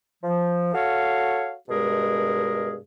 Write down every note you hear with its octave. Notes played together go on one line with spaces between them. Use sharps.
F3
F#4 A4 C#5 F5
G2 B2 G#3 G#4 A#4